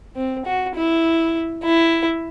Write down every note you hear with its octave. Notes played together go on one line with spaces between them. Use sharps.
C4
F#4
E4
E4